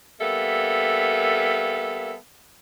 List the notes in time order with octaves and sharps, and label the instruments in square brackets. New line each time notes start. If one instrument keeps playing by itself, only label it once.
[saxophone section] G3 A#3 B3 A4 E5